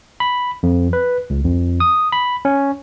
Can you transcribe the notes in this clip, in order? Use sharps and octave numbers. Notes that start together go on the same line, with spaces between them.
B5
F2
B4
C#2
F2
D#6
B5
C#4